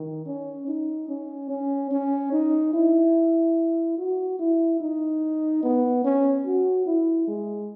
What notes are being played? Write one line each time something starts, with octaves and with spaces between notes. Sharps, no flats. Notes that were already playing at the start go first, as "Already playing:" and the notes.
Already playing: D#3
C#4
D#4
C#4
C#4
C#4
D#4
E4
F#4
E4
D#4
B3
C#4
F#4
E4
G#3